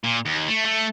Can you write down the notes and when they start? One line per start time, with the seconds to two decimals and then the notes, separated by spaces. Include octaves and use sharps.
0.04 A#2
0.26 D#2
0.49 A3
0.66 A3